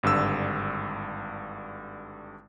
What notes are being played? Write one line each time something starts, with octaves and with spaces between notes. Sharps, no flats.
G#1 G2 D3 E6